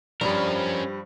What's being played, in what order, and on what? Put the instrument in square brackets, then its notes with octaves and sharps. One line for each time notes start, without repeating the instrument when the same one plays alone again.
[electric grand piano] G2 G3 [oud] F3 [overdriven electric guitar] C#4 A#4 [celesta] D5 B5